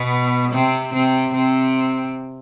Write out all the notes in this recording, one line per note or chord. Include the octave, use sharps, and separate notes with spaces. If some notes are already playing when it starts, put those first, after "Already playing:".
Already playing: B2 B3
C3 C4
C3 C4
C3 C4